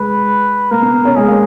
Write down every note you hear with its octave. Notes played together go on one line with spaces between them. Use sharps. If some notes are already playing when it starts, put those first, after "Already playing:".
Already playing: G#3 B4
A#3 A#4
B3
C#4
G#3 G#4
A#3